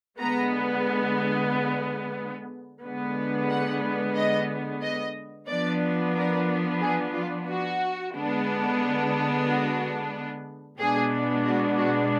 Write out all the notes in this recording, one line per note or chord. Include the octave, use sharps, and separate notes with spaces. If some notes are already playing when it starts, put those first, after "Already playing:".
D3 G#3 B3 A#5
D3 G#3 B3
F#5
D#5
D#5
F3 B3 D4 D5
A#4
G#4
F4
F#4
D3 G#3 B3 D4
F#4
B2 G#3 B3 D4 G#4
F#4
F#4